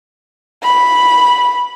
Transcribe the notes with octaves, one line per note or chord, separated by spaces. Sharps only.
B5